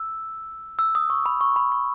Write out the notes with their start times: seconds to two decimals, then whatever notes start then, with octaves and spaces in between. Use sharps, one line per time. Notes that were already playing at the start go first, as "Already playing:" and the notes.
Already playing: E6
0.79 E6
0.95 D#6
1.10 C#6
1.26 B5
1.41 C#6
1.56 B5
1.72 C#6